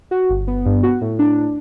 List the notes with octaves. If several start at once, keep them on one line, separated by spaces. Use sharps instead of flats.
F#4
G1
B3
G2
F#4
A2
D4